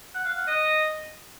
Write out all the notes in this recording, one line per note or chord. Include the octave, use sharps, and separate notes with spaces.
F#5
F5
F#5
D#5